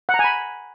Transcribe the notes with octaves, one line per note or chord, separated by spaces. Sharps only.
F#5
A#5
G#5
B5